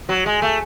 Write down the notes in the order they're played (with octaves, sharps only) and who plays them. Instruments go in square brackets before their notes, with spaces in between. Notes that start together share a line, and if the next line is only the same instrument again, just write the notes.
[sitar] F#3
G#3
A3